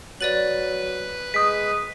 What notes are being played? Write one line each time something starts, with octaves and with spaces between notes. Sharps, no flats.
F#3 B4 D5 A6 F#7
G#3 D#6 B6